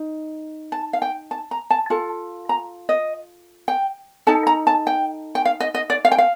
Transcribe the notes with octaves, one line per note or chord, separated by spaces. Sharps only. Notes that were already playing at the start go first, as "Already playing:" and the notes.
Already playing: D#4
A5
F5
G5
A5
A#5
A5
F4 A4 A5
A#5
D#5
G5
D#4 A4 A5
A#5
A5
G5
G5
F5
D#5
D#5
D5
F5
G5
F5